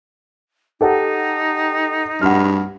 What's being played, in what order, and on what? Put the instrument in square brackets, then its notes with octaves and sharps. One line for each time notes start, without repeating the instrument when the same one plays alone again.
[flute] D#4 [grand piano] G4 A4 F#5
[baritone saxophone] G2 [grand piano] F#5 F6